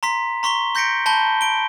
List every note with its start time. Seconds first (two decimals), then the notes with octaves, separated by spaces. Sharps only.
0.03 A#5 C6 B6
0.43 A#5 C6 C#6 B6 G7
0.75 C6 G6 A#6 B6 C#7 D7
1.06 A5 B5 G6 G7
1.41 D7 G7